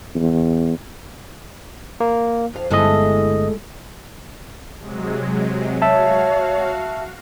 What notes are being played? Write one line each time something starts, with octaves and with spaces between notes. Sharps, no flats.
E2
A#3
F2 F5
G1 G#3 A3 E4 D#5
C3 F#3 G#3
F#4 C#5 E5 F5 A5